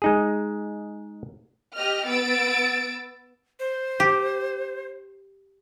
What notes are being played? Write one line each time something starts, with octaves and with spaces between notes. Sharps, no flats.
G#3 D#4 G#4
G4 D#5 F6
B3 E6 A6 D7
C5
G4